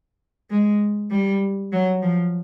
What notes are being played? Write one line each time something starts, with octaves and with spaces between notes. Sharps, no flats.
G#3
G3
F#3
F3